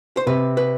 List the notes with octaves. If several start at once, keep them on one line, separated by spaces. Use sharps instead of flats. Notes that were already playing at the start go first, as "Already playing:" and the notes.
C5
C3 B4
B4